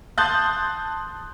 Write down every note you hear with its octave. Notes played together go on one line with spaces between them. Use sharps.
A5 C6 D#6 F#6 G6 A6